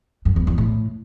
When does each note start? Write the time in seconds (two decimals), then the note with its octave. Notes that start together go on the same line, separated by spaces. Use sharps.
0.25 F#2
0.36 E2
0.47 E2
0.58 A2